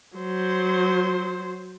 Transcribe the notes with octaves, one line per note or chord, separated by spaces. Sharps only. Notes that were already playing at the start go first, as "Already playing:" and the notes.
F#3 C5